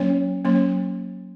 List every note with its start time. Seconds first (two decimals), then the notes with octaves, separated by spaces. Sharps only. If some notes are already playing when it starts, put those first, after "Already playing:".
Already playing: F#3 A#3 C#4 C#5
0.45 F#3 A#3 C#4